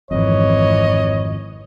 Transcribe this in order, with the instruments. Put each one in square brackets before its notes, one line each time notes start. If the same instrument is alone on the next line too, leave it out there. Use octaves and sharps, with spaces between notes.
[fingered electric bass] G#1 F2 [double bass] G#2 E3 [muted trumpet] C#5 [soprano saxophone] D#5